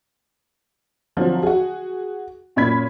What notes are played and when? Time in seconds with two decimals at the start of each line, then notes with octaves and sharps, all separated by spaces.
1.17 D3 F3 F#3 C4
1.43 F#4 G#4
2.56 F#2 A#2 C#4 B5 G#6 B6